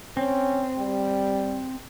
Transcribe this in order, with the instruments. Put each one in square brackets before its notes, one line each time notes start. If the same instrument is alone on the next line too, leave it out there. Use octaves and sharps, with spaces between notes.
[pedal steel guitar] C4 [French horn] C#4
[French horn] G3